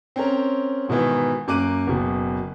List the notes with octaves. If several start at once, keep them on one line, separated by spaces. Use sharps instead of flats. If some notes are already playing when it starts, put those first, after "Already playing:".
C4 C#4 A#4
G#2 B2 D#3 E3
F#2 A#3 D6 F#6 D#7
F#1 B2